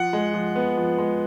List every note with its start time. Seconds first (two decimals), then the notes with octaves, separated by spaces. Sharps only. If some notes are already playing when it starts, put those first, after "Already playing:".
Already playing: F3 F#5
0.13 G#3
0.34 F3
0.56 B3
0.77 F3
0.98 G#3